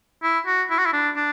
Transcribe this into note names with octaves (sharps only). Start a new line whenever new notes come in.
E4
F#4
E4
F#4
E4
D4
D4